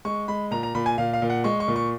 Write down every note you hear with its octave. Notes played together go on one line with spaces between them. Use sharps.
G#3 C#6
G#3 B5
A#2 A#5
A#5
A#2 B5
G#5
A#2 F5
F5
A#2
F#5
G#3 C#6
C#6
A#2
C#6